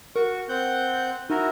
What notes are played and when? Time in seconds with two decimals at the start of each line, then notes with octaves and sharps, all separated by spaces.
0.16 F#4 A#4 C#6
0.49 C4 F#5 G6
1.30 D#4 E4 F#4 A#4